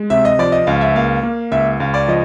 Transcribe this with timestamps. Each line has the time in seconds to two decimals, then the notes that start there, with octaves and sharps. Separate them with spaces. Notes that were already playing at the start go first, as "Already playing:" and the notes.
Already playing: G#3
0.10 C3 E5
0.25 D#5
0.39 F3 D5
0.52 D#5
0.67 C#2 F5
0.81 E5
0.95 A#3 F5
1.23 A#3
1.52 C#2 E5
1.80 C#2 F5
1.94 D5
2.08 F3 D#5